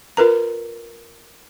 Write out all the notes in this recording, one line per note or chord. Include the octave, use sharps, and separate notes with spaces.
F4 A#4 B4 A#5